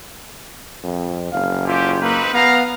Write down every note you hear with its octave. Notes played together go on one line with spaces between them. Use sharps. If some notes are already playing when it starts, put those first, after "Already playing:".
F2
F#1 F5
C4 C#4 F4 G4
A#3 C4 D#4 B4
B3 F5 A#5